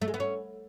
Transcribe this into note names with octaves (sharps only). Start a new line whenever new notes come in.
A3
G#3
B3
C#4